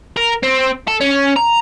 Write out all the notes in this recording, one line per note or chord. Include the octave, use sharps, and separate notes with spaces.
A#4
C4
A4
C#4
A#5